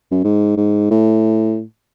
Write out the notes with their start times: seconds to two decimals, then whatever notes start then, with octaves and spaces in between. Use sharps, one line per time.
0.11 F#2
0.24 G#2
0.58 G#2
0.91 A2